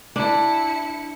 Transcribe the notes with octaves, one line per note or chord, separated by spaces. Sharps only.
D4 E4 C#7